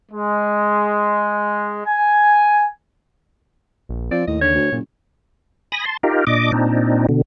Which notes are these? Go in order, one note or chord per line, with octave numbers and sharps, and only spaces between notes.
G#3
G#5
A#1
F3 C4 D5
D#2 A2 D#5
D3 C#5
D2
F#1 A#2
G#5 B5 D#6 A#6
A5 C6
D#4 F4 G4 A#4
A#2 D4 D#5 D6
A#2 C4 D4 D#4
B2 D3